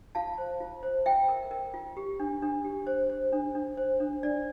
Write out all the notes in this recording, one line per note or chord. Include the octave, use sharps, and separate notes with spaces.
F4 F5 A5
C5
F4
C5
F4 E5 G5
A#4
A#4
F4
G4
D4
D4
G4
C5
C5
D4
D4
C5
D4
D4 D5